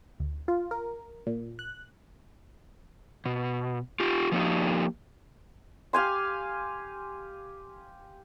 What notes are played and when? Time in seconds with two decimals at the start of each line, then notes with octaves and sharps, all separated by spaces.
0.20 D2
0.48 F4
0.71 A#4
1.27 A#2
1.59 F#6
3.26 B2
4.00 F4 G4
4.32 F3 A#3 D#4 G4
5.93 G4 F5 G#5 C6